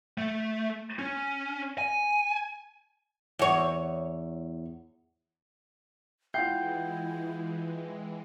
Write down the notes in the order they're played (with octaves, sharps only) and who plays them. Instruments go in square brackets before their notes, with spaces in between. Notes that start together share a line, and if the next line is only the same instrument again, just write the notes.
[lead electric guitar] A3
C#4
G#5
[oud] E2 C#5
[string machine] E3 G#3 [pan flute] E4 [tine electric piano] F4 G6 [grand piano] F#5 G5 C7